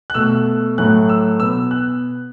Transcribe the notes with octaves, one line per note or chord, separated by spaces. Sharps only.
F#6
B2 A3 E6
A2 F#3 A3 F#6
E6
B2 B3 E6
F#6